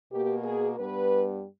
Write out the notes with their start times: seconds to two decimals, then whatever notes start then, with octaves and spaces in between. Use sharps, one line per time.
0.12 B2 A#3 G4
0.44 G#4
0.77 G2 G3 B3 B4